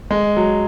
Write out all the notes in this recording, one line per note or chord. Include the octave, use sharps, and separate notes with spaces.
G#3
F#3